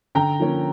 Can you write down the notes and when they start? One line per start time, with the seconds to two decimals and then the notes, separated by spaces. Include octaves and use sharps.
0.15 D3 G5 A#5
0.40 F3 A#3 C#4